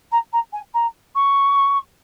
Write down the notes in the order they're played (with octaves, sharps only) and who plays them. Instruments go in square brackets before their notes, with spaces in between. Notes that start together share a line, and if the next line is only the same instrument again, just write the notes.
[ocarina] A#5
A#5
G#5
A#5
C#6